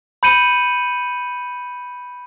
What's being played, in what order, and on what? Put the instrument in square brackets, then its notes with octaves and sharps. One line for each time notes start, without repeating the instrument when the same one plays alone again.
[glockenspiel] B5 G6 C#7 D#7 F#7